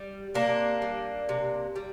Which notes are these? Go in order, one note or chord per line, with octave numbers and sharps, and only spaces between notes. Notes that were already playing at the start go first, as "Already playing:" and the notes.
Already playing: G3
C3 A#3 D4
G3
C3
G3